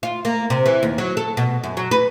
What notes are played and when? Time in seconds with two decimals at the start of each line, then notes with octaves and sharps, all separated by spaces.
0.03 F4
0.25 A#3
0.50 C3
0.66 E3
0.83 D#2
0.98 F#3
1.17 A4
1.37 B2
1.64 F#2
1.77 F#3
1.91 B4